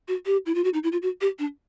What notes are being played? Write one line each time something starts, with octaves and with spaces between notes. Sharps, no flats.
F#4
G4
E4
F4
F#4
D#4
E4
F4
F#4
G4
D4